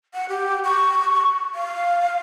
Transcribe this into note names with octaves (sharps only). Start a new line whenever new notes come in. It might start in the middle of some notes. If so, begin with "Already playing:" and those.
F#5
G4
C#6
F5